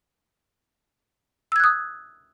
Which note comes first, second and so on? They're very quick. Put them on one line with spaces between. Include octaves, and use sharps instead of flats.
E6 G#6 F#6 D#6